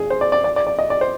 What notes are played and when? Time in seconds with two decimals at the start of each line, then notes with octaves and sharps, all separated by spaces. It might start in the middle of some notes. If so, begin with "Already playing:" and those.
Already playing: G#4
0.10 C5
0.21 D5
0.32 D5
0.44 D5
0.56 D5
0.67 D5
0.79 D#5
0.90 D5
1.01 C5